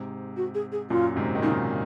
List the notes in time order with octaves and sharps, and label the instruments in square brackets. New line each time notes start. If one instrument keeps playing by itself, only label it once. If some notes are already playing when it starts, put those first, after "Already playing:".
Already playing: [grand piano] G#2 C3
[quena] F#4
G#4
G#4
[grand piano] F#2 A#2 [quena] F4
[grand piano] G#2 C3
D#3
[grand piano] A#2 C#3 [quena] D#4